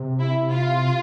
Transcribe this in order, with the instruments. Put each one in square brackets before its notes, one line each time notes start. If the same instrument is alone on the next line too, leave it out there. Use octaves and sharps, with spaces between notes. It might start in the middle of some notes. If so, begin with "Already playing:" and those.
Already playing: [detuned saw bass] C3
[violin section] E4
F4